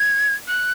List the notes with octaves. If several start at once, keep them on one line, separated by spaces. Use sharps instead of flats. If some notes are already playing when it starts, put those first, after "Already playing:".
Already playing: G#6
F#6